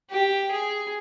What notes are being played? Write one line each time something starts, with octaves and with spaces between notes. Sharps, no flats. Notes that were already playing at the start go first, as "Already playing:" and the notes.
G4
G#4